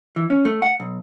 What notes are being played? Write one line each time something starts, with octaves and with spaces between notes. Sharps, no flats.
E3
C#4
A3
F#5
B1